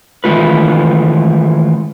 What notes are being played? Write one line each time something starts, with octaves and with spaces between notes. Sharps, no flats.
D#3 E3 G#3 A3 F4 B4